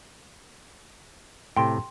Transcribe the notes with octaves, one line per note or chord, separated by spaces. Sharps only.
A2 C3 G5 C6